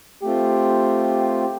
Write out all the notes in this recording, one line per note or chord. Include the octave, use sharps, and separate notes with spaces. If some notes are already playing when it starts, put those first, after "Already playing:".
A3 C4 F4 G4